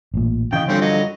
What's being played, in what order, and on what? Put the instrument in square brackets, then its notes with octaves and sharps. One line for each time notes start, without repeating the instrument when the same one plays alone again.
[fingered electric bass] A1 A#2
[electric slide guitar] C#3 D#5 [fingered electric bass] E3 [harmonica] G5
[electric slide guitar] G2 D3 F3 [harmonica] C4 C#4
[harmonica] F#3 D#5